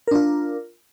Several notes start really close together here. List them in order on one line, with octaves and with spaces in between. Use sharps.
A#4 D4 F4